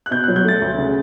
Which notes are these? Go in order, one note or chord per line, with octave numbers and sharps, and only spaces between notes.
F#6
B2 G6
F#6
F#3
G6
A3 A6
D2
C#3